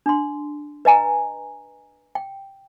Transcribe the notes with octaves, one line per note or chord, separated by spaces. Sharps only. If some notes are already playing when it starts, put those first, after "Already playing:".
D4 C6
B4 D#5 G#5 A#5
G5